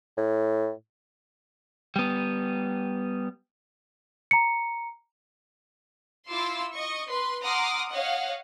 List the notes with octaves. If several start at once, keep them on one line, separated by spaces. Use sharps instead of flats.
A2
G3 B3
A#5 C#7
E4 F4 C6 D6 E6
D#5 C#6
B4 C6
F#5 A#5 C6 D6 D#6 F6
C#5 D#5 F5 F#5